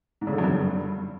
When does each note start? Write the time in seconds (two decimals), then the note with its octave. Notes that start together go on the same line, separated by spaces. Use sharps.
0.21 G#2
0.27 C#3
0.33 D3
0.38 F#2
0.44 G2